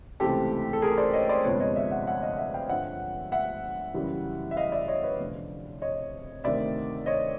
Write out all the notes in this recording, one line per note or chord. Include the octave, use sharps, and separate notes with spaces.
C#2 C3 E3 A3 C4 G4 A4
A4
G#4 A#4
C5 D5
C#5 D#5
C5 D5
G1 F2 C3 F3 G#3 B4 C#5
C#5 D#5
D5 E5
E5 F#5
E5 F#5
D#5 F5
E5 F#5
F5 G5
G2 D3 F3 E5 F#5
E5 F#5
F#2 C#3 E3 G3
E5
D#5 F5
D5 E5
C#5 D#5
B4 C#5
F1 F2 D3
C#5 D#5
D2 C3 D#3 D5 E5
C#5 D#5